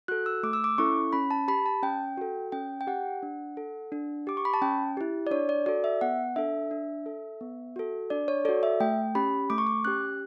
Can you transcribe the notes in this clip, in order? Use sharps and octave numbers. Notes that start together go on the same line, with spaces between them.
F#4 A4 F#6
E6
A3 D6
E6
D6
C#4 E4 A4 C#6
C#4 B5
A5
G4 B5
A5
C#4 G5
F#4 A4
C#4 G5
G5
G4 F#5
D4
A4
D4
G4 D6
C#6
B5
A5
C#4 G5
E4 G4
D5
D4 C#5
D5
F#4 A4 D5
E5
B3 F#5
D4 A4 E5
D4
A4
B3
F#4 A4
D4 D5
C#5
F#4 A4 D5
E5
A3 G5
C#4 G4 B5
A3 D6
C#6
D6
C#4 G4 F#6